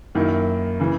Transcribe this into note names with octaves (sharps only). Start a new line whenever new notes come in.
F#2 D#3 A#3 E4
C#3 E3